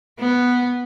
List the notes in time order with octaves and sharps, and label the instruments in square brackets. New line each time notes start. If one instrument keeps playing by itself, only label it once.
[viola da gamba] B3